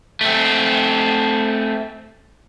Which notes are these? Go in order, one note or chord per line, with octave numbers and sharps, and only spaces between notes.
A3 C4